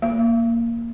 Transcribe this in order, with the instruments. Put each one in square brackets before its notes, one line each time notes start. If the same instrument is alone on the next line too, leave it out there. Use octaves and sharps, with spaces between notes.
[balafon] A#3